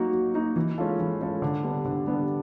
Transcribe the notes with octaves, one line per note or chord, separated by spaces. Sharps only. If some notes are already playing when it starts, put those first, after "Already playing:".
Already playing: F#3 A#3 D#4 F#4
F#3
A#3 D#4 F#4
E3
G#3 C#4 F4 A4
E3
G#3 C#4 F4 A4
D3
G3 B3 D4
D3
G3 B3 D4